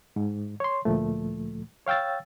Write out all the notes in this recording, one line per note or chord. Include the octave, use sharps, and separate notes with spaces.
G#2
C#5 C6
D2 A#2 F3 A3
C#5 F5 G5 E6 A6